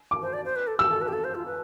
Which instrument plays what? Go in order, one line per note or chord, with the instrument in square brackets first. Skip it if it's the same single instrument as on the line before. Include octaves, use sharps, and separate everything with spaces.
[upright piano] D6
[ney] C5
D5
C5
B4
A4
[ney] G4 [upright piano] E6
[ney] A4
B4
G4
A4
C5
F4
B4